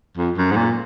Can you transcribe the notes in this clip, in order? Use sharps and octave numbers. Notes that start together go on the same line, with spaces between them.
F2
F#2
G#2
A#2